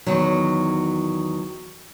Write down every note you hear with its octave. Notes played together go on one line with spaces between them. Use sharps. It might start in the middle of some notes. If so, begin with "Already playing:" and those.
E2 D#3 F#3